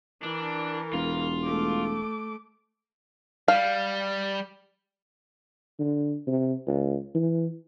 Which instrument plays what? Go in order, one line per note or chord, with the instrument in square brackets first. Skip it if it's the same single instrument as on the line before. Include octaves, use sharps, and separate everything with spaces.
[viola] E3 A#4 [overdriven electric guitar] D4
[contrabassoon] E1 [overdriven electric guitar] F4
[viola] A3 D6
[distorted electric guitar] G3 [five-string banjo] F5
[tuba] D3
C3
C#2
E3